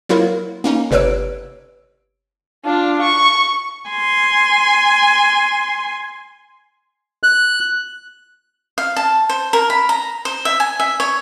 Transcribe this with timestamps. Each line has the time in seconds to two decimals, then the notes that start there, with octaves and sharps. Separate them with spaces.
0.09 F#3 A#3 E4 F4 A#4
0.64 A#3 C#4 D#4
0.91 G1 C3 B4 C#5 E6 D7
2.64 D4 F4
3.01 C#6
3.90 G#5 C6
7.23 F#6
8.78 F5
8.96 A5
9.29 C5
9.53 A#4
9.70 B5
9.89 A#5
10.25 C5
10.45 E5
10.60 G#5
10.80 E5
11.00 C#5